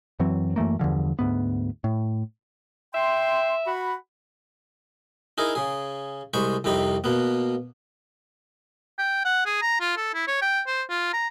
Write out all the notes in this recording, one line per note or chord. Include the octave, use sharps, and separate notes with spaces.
F#2 E3 F#3 C4
F#2 E3 A3 A#3
E2 G2 D3 F3
D2 G#2 B3
A2
E5 G5 C6
F#4 F#5 B5
D#4 E4 G#4 A#4
C#3 G#4
C2 G#3 C5 B5 C#6
C2 F2 C3 D#4 B5
B2 A#3 B3
G5
F#5
G#4
A#5
F4
A4
E4
C#5
G5
C5
F4
A#5